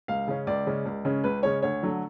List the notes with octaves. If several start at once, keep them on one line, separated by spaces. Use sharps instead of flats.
C#2 F5
C#3 G#3 C#4
C#2 D5
C#3 G#3 C#4
C#2
C#3 G#3 C#4
C#2 B4
C#3 G#3 C#4 C#5
D2 C#5
D3 F#3 A3